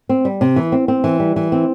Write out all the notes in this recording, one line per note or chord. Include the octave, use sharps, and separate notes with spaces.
C4
G3
C3
E3
C4
C4
E3
G3
E3
C4